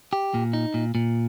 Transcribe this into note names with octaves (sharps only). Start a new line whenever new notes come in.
G4
A#2
D#4
A#2
A#2